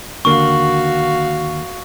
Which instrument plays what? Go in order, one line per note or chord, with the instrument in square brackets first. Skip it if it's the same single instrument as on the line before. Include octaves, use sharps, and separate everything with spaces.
[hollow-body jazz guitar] D#2 D3 A#3 [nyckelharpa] F#4 F5 [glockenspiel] C#6